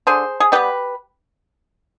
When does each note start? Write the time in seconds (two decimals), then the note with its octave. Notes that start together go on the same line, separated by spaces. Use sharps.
0.07 D3 G#4 C5
0.40 G#4
0.52 G3 B3 G4 B4